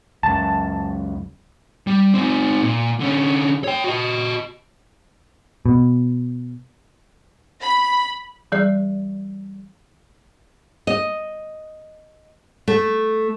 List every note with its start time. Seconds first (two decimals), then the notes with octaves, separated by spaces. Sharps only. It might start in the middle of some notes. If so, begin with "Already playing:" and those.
0.23 C#2 F#2 A5
1.87 G3
2.14 C4 D#4
2.62 A#2
3.00 D3 C#4
3.64 C#5 G5
3.84 F#4 D#5
5.66 B2
7.61 B5
8.52 E3 G3 G#4 D5
10.87 D#5
12.68 A3